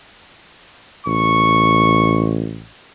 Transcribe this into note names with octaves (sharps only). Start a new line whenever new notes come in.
A1 C#6